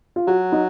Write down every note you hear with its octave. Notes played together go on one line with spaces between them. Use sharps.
F4
F#3 F#4
D#4